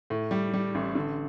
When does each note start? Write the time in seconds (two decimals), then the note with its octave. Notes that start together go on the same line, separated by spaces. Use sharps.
0.10 A2
0.31 G3
0.53 G3
0.75 A1
0.95 D3